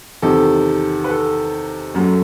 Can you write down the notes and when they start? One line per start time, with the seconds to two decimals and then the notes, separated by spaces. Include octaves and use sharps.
0.22 E2 C3 D#3 A4
1.04 B4
1.09 A4
1.94 F#2 F#3 A3